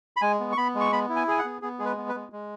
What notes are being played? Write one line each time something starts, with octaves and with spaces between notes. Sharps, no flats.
B5
G#3 G#5
B3
C#6
B3 B5
G#3
C#6
B3 B5
E4
G#5
G#4 G#5
F#5
B3
B3 G#4
G#3 G#4
B4
B3
B4
G#3
G#3